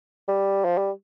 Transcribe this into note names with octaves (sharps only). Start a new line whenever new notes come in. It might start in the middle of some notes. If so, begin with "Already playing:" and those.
G3
F3
G3